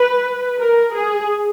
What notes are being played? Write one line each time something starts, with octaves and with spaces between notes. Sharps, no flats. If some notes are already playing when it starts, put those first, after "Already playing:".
Already playing: B4
A#4
G#4